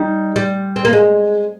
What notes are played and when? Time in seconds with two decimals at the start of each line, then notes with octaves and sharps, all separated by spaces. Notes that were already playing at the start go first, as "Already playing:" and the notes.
Already playing: G3 D#4
0.36 G3
0.76 C4
0.85 A#3
0.93 G#3